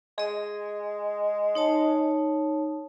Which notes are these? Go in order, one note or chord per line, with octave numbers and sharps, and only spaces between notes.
G#3 G#4 D#5
D#4 C#5 A5